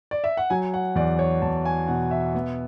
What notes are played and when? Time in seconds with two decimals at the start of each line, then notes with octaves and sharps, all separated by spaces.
0.11 D5
0.24 E5
0.37 F#5
0.50 F#3 G#5
0.74 F#5
0.95 E2 D5
1.19 C#5
1.42 E2 A5
1.65 G#5
1.88 B2 F#5
2.11 E5
2.35 B3